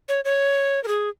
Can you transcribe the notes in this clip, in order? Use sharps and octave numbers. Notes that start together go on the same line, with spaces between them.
C#5
C#5
A#4
G#4